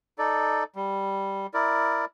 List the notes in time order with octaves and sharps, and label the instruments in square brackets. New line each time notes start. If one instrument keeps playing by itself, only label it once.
[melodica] D#4 A4 D5
G3
E4 A#4 D5